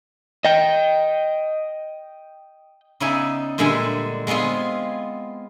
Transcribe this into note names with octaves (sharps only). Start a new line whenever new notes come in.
D#5 G5
C#3 B3 D#4 D5 E5 G#5
A#2 D3 G3 G#3 E5 G#5
G#3 B3 C4 F4 G#4